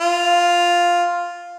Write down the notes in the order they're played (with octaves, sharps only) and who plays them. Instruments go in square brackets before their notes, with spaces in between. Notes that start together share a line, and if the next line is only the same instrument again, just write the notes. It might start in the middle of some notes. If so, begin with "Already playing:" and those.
[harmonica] F4